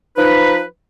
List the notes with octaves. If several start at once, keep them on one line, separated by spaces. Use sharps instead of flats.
F3 D#4 B4